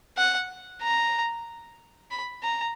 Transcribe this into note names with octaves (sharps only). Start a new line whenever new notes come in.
F#5
A#5
B5
A#5